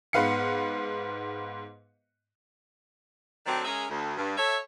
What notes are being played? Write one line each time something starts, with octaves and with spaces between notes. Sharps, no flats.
G#2 B3 B4 F5 C7 C#7
D#3 F#3 A3 C4 D4
G#3 C#4 G#4 A#4 D#5 E5
D2
G2
A4 C#5 E5